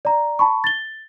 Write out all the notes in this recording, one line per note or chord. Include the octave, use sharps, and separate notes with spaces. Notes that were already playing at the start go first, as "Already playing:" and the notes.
D5 A#5
A5 B5 C#6
A6 G7